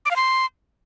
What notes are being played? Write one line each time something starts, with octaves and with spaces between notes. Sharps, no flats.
D6
F5
C6